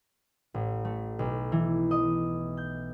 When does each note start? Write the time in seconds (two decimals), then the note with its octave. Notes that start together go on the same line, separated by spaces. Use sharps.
0.54 A1
0.85 A3
1.19 B1
1.52 E3
1.91 D#5
2.57 G6